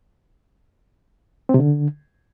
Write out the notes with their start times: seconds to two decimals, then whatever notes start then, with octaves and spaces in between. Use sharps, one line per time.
1.49 C4
1.54 C3
1.59 D3